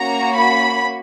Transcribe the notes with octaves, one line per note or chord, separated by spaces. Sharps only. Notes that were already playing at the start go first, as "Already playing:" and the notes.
Already playing: A#3 C#4 F#4 A#5
B5